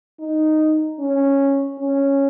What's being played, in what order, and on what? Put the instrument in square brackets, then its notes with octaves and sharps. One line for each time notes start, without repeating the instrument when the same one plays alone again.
[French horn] D#4
C#4
C#4